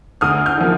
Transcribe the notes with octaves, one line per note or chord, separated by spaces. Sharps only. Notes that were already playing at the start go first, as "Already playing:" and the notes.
D2 D#6 F6
F6 G6
D3 F3 A#3